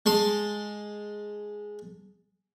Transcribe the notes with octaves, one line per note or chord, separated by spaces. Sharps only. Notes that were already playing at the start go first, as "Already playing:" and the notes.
G#3 A5 C6